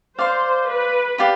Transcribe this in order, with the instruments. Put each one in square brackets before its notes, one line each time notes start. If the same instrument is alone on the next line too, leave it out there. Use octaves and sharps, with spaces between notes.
[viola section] C5 [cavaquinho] D5 F5 C6
[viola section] B4
[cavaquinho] G4 D5 F5 B5